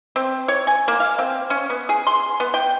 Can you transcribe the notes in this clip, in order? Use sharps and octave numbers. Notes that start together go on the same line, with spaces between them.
C4
C#5
G#5
A#3
F5
C4
C#4
B3
G#4
C6
B3
G5